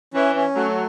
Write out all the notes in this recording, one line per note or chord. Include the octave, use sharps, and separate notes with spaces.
E3 C#4
C#4
F#3 A3